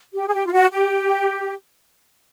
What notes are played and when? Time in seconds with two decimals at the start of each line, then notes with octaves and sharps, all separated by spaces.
0.14 G4
0.27 G#4
0.33 G4
0.45 F4
0.53 F#4
0.72 G4